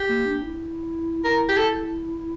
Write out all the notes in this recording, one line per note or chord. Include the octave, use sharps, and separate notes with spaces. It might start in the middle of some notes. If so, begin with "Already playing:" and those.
Already playing: G4
A#3
D4
E4
E4 A#4
G4
A4